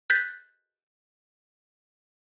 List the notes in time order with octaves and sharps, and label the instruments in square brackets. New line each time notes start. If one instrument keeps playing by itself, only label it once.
[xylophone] F#6 G6 A6 B6